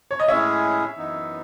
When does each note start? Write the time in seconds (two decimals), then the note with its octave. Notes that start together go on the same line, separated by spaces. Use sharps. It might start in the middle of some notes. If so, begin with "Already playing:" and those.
0.11 C#5
0.20 D#5
0.28 A2 G#3 C#4 E4 G#4 C#5 E5
0.97 F#2 E3 B3 D#4